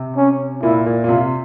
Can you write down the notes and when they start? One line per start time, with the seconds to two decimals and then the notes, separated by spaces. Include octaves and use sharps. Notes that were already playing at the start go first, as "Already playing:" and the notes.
Already playing: C3
0.17 C#4
0.63 A#2 E4
0.86 A#2
1.04 A#2
1.08 C3 F4